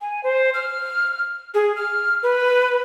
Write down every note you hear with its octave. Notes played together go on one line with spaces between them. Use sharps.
G#5
C5
F6
G#4
F6
B4